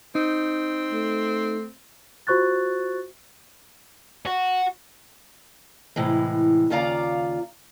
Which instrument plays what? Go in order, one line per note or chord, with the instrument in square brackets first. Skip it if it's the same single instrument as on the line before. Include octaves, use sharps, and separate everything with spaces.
[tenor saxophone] C4 [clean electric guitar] D#4
[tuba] A3
[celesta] F4 F#4 C5 C#6 F#6 A6
[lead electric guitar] F#4
[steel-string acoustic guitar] A2 C3 E3 G#3
D#2 C#3 F4 D5 F5 A#5